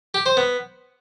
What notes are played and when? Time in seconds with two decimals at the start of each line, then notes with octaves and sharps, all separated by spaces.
0.14 G4
0.26 C5
0.37 B3